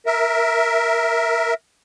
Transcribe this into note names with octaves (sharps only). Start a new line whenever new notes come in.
A#4 E5